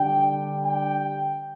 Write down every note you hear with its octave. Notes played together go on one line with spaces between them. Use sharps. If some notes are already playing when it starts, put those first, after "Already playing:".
Already playing: D3 G3 D4 G5
G5